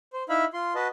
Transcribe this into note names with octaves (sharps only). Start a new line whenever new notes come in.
C5
D#4 E4 E5 F5 B5
F4 C6
F#4 B4 D#5 A5